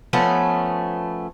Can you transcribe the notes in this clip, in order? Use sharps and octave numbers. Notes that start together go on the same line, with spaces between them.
F3 A3 B3 C#4